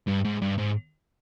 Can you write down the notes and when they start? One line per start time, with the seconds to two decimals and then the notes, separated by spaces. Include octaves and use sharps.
0.08 G2
0.25 G#2
0.42 G2
0.58 G#2